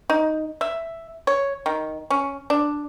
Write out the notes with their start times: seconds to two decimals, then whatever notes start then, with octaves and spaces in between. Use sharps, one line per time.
0.10 D#4
0.61 E5
1.27 C#5
1.66 D#3
2.10 C#4
2.50 D4